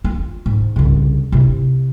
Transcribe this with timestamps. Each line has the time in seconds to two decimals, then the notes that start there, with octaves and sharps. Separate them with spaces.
0.04 F4
0.46 G#2
0.76 C2 C#3
1.32 C3 E4